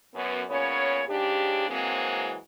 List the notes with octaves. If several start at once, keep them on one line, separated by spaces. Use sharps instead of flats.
F#2 B3
A#2 C#3 B3 C#4 C#5
G#2 C#3 D4 G4
E3 F#3 G#3 A#3 C4